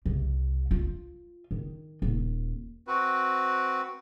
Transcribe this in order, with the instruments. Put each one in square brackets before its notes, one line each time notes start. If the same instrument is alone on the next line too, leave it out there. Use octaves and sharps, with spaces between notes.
[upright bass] C2
F4
D#3
D#1
[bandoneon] C4 F#4 B4